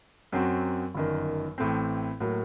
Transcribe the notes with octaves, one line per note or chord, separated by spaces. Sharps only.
F#2 F#3 C4 F#4
G1 F#2 D#3
A1 A2 A3 C4
A2 F#3 A#3